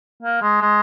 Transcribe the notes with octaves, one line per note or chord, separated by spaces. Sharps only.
A#3
G#3
G#3